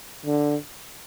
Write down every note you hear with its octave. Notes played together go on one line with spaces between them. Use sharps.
D3